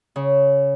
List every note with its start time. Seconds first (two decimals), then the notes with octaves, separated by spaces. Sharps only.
0.16 C#3